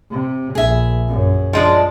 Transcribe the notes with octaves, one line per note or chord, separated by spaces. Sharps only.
C3
A#1 G#4 E5
F#2
F3 G#3 D4